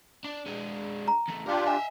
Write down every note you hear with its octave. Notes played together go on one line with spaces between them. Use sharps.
D4
G#3 D4
A#5
E2 A3
D4 F4 G4 A#4 D5
D#5 E5 G#5